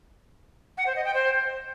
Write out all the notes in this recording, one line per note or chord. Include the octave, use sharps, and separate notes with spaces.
F#5
C5
D#5
G5
C5